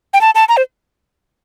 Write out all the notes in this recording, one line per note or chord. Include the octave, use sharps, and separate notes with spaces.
G5
A5
A5
A#5
C5